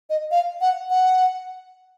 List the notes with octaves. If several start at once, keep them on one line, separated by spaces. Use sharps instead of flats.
D#5
F5
F#5
F#5